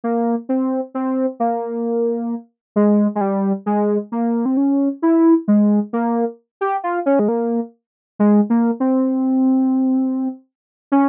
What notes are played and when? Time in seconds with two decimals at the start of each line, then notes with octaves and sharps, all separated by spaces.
0.04 A#3
0.49 C4
0.94 C4
1.40 A#3
2.76 G#3
3.15 G#3
3.21 G3
3.66 G#3
4.12 A#3
4.45 C4
4.57 C#4
5.02 E4
5.48 G#3
5.93 A#3
6.61 G4
6.84 F4
7.06 C#4
7.19 G#3
7.28 A#3
8.19 G#3
8.50 A#3
8.80 C4
10.92 C#4